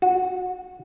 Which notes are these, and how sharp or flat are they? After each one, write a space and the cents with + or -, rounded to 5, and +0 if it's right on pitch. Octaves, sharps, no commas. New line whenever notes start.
F#4 -20